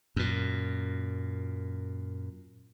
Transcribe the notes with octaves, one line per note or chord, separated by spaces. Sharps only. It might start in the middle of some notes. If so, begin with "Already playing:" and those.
F#2 A#2